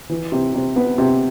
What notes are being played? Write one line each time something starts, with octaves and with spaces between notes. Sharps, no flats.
E3
C3
C3
B3
C3